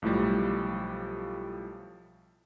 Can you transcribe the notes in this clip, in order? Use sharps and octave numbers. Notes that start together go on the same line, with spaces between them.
B1 A2 F3 G3